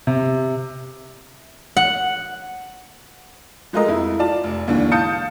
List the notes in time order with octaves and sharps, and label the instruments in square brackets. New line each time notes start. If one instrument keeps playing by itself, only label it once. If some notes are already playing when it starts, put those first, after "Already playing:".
[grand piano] C3
[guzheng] F#5
[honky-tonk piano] F3 G#3 A3 F4 A#4 D#5
F2 E4
F4 D5 A5
F1
G#1 D#2 D3 E3
F5 A5 D#6 G6 C#7